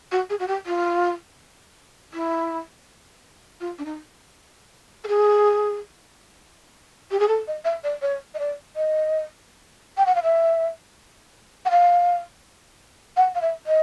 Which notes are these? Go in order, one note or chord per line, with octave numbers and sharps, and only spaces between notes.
F#4
G#4
F#4
G4
F4
E4
F4
D4
D#4
A4
G#4
G4
G#4
A4
D#5
E5
D5
C#5
D#5
D5
D#5
G5
F#5
F5
E5
F#5
F5
F#5
F5
E5
D#5